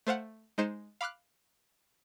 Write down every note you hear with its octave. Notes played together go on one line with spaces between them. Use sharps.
A3 C5 F5 F#5
G#3 D#4 C5 C#7 E7
F5 B5 D6 F6 F#6